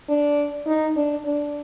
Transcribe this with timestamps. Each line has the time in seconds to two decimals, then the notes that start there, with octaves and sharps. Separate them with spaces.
0.09 D4
0.67 D#4
0.96 D4
1.25 D4